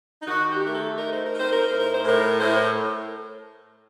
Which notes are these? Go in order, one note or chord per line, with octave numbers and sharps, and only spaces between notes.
D#4
D#3 F#4
G4
A3 A#4
A4
D#4 A#4
C5
A#4
D#4
C5
A#4
A2 C5
A#4
C5
A2 A#4
A2 C5
A#4